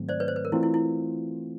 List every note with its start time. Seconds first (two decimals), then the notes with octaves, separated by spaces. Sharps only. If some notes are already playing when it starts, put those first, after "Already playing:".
Already playing: G#2 D#3 F#3 A3 C4
0.09 C5 D5
0.20 B4 C#5
0.28 C5
0.36 B4
0.45 A#4
0.52 E3 A3 C4 E4 F4
0.63 E4
0.74 E4